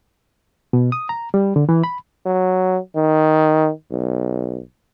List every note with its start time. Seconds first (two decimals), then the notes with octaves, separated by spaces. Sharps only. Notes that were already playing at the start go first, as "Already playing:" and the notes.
0.73 B2
0.92 D#6
1.09 A#5
1.34 G3
1.56 D3
1.69 E3
1.84 B5
2.26 F#3
2.96 D#3
3.91 B1